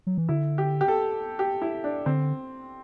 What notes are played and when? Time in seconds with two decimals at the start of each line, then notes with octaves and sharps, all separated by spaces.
0.07 F#3
0.18 E3
0.29 D3 E4
0.58 G4
0.81 G4
0.88 A4
1.39 G4
1.62 E4
1.84 D4
2.06 D3 C4